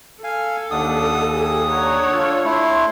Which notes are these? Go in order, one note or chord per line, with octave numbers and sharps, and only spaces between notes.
A4 F5 G#5
D#2 D4 D#4 F#5 D#6
G4 G#4
D4 C#5 F#5 A#5
F4 A4
A3 E4 C6